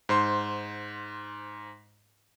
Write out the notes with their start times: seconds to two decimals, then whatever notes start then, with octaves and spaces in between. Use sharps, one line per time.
0.09 G#2 C5 C6